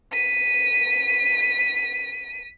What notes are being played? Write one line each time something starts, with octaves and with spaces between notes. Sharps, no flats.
B6 D#7